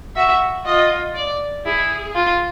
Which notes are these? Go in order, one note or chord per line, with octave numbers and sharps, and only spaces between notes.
F#4 E5
F4 D#5
D5
E4 G#4
F4